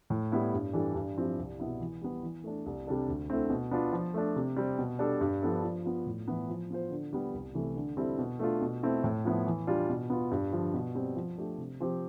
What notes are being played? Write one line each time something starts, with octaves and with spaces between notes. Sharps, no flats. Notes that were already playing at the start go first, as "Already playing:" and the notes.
A2
G3 B3 E4
G2
E3 G3 D4 A4
G2
F3 C4 E4 G4
C2
B2 B3 E4
E3
G3 B3
E3
A3 D4
C2
C3 G3 D4 A4
D2
D3 A3 C4 E4
B2
B3 D4 F4
F3
A3 D4
C3
G3 C4
B2
G3 D4 A4
G2
F3 B3 D4 A4
F3
B3 F4
A2
E3 B3 E4
F3
B3 F4 C5
D3
G3 B3
C2
C3 E3 A3
D3
G3 C4 E4 A4
B2
A3 D4 F4
B2
A3 C4 E4 A4
A2
F3 B3 E4
E3
G3 D4 F4
B2
B3 F4
G2
D3 F3
B2
G3 C4
F3
A3 D4 G4
C3
F3 C4 G4 C5